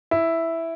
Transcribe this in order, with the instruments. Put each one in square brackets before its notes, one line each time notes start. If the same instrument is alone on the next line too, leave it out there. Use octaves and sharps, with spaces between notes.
[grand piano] E4